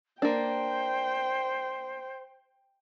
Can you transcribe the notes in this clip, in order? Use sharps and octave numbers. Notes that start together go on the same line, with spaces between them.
A#3 D4 C5 G5